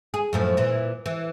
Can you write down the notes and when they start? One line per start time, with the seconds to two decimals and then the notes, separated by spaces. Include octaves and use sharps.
0.14 G#4
0.33 F#2 A2 F3
0.57 A#2 E3
1.06 E3